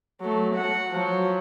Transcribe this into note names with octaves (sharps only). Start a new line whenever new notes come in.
F#3 A3
F#4 F#5
F3 F#3